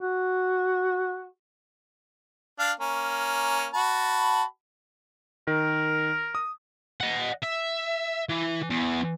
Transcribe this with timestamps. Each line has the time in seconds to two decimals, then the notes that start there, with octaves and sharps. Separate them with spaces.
0.01 F#4
2.59 D4 F5
2.80 A#3 C#4
3.74 F#4 A5 B5
5.47 D#3 A#4
6.35 D#6
7.01 D#5 F#5
7.43 E5
8.29 E3
8.70 E2